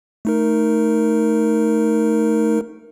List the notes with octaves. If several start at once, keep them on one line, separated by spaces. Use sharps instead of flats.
A3 D#4 A#4